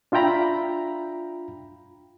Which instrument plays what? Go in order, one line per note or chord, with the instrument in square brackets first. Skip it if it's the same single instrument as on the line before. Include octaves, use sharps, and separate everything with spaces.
[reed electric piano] D4 F4 E5 G5 A#5 B5